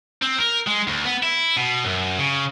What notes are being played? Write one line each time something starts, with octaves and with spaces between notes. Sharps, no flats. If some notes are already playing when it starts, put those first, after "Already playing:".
C4
A#4
G#3
D2
B3
E4
B2
F#2
C#3